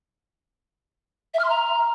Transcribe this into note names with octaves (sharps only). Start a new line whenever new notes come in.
E5
F6
C6
A#5